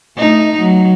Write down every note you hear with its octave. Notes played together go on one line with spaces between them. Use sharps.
A3 D#4
F#3